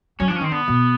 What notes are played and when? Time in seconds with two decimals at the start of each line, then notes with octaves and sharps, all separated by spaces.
0.20 F#3 C#4
0.28 F3 D4
0.36 C#4
0.41 D#3 C4
0.51 D3 B3
0.68 B2